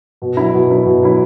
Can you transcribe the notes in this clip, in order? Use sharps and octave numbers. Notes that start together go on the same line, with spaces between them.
B2
F#3 E4
B2
F#3 E4
B2
F#3 E4